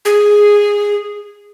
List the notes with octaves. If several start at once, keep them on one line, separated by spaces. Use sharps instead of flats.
G#4